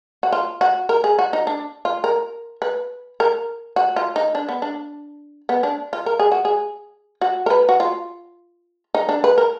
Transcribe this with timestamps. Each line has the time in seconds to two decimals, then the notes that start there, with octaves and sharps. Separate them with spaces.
0.23 F#4
0.33 F4
0.61 F#4
0.89 A#4
1.04 G#4
1.19 F#4
1.33 D#4
1.47 D4
1.85 F4
2.04 A#4
2.62 B4
3.20 A#4
3.76 F#4
3.96 F4
4.16 D#4
4.35 D4
4.49 B3
4.62 D4
5.49 B3
5.63 D4
5.93 F4
6.06 A#4
6.20 G#4
6.32 F#4
6.45 G#4
7.21 F#4
7.46 A#4
7.50 B4
7.69 F#4
7.80 F4
8.95 D#4
9.09 D4
9.24 B4
9.38 A#4